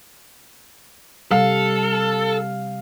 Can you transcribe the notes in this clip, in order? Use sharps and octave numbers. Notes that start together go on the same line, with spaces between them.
C3 G3 A4 F5